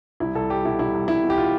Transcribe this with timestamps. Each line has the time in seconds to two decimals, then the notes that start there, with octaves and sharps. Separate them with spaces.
0.20 C2 E4
0.35 C2 A4
0.50 G3 G4
0.64 B2 E4
0.79 C2 E4
0.94 C2
1.08 G3 E4
1.24 B2
1.30 G4
1.38 F4